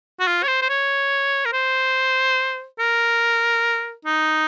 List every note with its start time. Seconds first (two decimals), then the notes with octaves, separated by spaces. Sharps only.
0.20 F#4
0.27 F4
0.43 C#5
0.48 C5
0.62 C5
0.69 C#5
1.45 A#4
1.53 C5
2.79 A#4
4.05 D#4